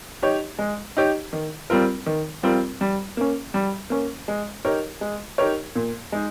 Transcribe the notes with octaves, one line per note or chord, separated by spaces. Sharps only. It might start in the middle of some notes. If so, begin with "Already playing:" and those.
D#4 G4 C#5
G#3
D#4 G4 C#5
D#3
G3 C4 F4 A#4
D#3
G3 C4 F4 A#4
G3
A#3 C#4
G3
A#3 C#4
G#3
D#4 G4 A#4 C#5
G#3
D#4 G4 A#4 C#5
A#2
G#3 D#4